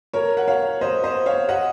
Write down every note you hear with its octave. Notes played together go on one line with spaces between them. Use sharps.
A#4 C#5
F#5
C#5 F5
C5 D#5
C5 D#5
C#5 F5
D#5 F#5